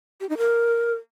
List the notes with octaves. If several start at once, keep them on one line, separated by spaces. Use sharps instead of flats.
G4
D#4
A#4